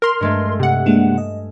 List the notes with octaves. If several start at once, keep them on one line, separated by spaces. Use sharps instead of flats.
A#4 C6 F6
G2 G#3 A3
C3 F#5
G#3 A#3 D4 E7
D#5